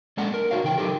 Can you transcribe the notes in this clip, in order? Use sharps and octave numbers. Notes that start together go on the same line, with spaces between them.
G#3 A#3 C#4 D4 A4 F#5
A#4
D#4 F#4 C#5 F5
C#3 E3 G5
F#3 D#4 G4 A4 A#4